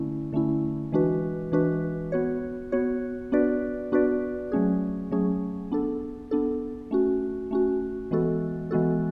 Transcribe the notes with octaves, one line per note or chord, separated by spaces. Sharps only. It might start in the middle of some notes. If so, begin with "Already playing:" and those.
Already playing: D3 A3 C#4 E4
D3 A3 C#4 E4
E3 G#3 D4 F#4 B4
E3 G#3 D4 F#4 B4
B3 F#4 C#5
B3 F#4 C#5
B3 D4 F#4 B4 D5
B3 D4 F#4 B4 D5
F#3 A3 C#4 G#4
F#3 A3 C#4 G#4
B3 D4 A4
B3 D4 A4
A3 C#4 F#4
A3 C#4 F#4
E3 G#3 B3 F#4 A4
E3 G#3 B3 F#4 A4